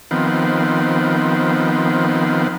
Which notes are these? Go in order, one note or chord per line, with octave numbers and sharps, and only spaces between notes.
D#3 F3 B3 C4